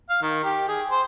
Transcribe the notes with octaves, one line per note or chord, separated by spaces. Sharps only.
F5
D#3
G4
G#4
C5